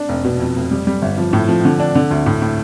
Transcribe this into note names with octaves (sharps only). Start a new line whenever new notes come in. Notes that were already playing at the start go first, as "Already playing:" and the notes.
Already playing: D4
F1
B2
F2
F1
G3
G3
G1
F3
A2
F3
D3
D4
D3
D2
A2
A2